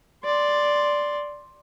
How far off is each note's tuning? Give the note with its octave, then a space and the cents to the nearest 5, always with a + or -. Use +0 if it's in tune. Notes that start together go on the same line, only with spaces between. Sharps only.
D5 +0 C6 +0